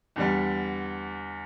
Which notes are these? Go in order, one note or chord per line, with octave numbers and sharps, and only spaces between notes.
E2 D3 G3